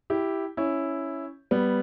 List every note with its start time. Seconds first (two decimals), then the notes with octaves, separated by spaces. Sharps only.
0.10 E4 G4
0.57 C#4 E4
1.51 G3 B3